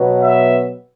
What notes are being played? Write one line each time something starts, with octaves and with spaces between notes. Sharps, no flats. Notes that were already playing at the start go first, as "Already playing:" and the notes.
Already playing: B2 F#3 B3
E5